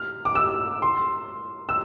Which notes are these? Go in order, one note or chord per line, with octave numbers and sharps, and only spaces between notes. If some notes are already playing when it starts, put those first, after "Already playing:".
Already playing: F6
D6
E6
C6
E6